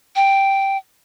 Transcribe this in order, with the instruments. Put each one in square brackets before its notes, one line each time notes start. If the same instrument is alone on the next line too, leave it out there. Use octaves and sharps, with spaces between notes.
[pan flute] G5